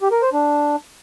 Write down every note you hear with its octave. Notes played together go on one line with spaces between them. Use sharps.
G4
A#4
C5
D4